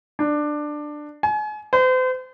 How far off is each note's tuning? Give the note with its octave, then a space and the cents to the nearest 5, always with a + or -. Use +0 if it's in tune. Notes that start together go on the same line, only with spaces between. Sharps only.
D4 +15
G#5 +35
C5 -40